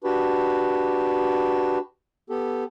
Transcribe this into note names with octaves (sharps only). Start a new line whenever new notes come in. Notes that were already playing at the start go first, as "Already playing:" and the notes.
D4 F#4 G4 B4
B3 G4 A4